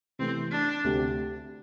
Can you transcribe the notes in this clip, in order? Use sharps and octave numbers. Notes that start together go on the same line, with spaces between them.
C3 E3 A3 C4
D4
D2 C3 A3 C4 G4